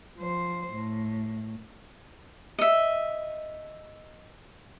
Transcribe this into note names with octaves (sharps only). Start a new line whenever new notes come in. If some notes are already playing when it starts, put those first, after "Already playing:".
F3 C5
A2
D#5 E5